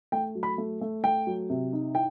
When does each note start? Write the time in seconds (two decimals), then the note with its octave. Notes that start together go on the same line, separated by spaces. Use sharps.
0.12 A3 G5
0.35 F#3
0.43 B5
0.58 A3
0.81 A3
1.04 A3 G5
1.27 F#3
1.50 C3
1.73 D#4
1.95 E4 G5